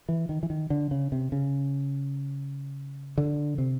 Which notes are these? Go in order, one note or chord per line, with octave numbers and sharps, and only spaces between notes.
E3
D#3
E3
D#3
D3
C#3
C3
C#3
D3
C3